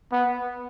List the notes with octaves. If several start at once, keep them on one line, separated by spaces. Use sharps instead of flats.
B3